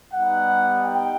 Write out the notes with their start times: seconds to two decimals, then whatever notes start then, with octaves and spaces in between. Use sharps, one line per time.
0.13 G3 B3 D#4 F#5
0.82 G5